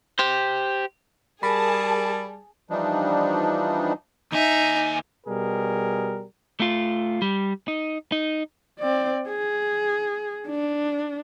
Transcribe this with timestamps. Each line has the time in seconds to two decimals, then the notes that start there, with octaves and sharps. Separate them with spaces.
0.19 G4 C5
1.43 G3 G#4 A#4 A5 B5
2.70 E3 F3 G3 D4 D#4
4.32 D#2 D#4 E5 G#5
5.26 B2 G3 G#4 A#4
6.60 A3 F4
7.22 G3
7.68 D#4
8.12 D#4
8.79 C4 D5
9.29 G#4
10.47 D4